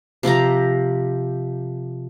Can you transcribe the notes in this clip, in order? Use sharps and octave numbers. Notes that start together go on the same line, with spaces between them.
C3 F3 G4 A#5